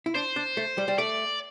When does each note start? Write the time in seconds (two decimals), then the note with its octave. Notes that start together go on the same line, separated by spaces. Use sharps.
0.06 E4
0.15 D4 C5
0.36 D4
0.57 A3
0.78 G3
0.88 G3
0.98 A3 D5